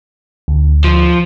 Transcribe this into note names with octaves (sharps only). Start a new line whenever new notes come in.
D2
F3